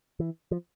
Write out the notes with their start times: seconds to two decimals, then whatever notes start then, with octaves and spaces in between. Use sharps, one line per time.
0.20 E3
0.51 F3